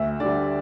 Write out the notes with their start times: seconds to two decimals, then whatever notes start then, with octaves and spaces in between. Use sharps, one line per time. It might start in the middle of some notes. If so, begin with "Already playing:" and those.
Already playing: D2 E5
0.20 D3 G3 D5